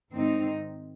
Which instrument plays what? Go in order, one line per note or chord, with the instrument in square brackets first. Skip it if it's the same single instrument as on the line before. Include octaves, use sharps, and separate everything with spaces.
[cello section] G#2 D#3 C4 D#4